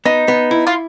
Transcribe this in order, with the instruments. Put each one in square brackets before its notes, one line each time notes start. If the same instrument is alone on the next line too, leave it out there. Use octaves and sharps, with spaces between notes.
[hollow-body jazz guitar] B3 [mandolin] D#4
[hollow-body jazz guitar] B3
E4
[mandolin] F4